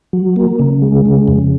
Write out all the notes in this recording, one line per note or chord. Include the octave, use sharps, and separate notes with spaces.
F#3
A#3
C#3
G#3
C#3
F2